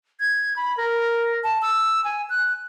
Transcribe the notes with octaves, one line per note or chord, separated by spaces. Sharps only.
G#6
B5
A#4
A5
E6
G#5
F#6